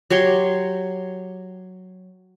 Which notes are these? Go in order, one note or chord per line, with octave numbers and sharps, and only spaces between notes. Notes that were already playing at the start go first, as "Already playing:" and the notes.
F#3 G4 C#5 C6